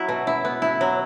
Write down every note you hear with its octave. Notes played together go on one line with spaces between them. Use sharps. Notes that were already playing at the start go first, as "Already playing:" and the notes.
Already playing: F#3 E4
B2
E4
B3
E4
F#3